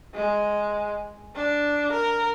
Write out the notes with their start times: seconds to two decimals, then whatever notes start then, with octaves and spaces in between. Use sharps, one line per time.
0.14 G#3
1.36 D4
1.92 A#4